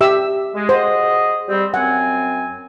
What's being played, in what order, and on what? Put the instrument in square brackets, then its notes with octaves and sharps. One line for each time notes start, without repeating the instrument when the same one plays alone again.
[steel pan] G4 E5 E6
[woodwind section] G#3
[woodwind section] F#4 G#4 D#5 [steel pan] C5
[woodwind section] G3 C4
[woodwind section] F#2 C4 G#5 [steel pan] F#5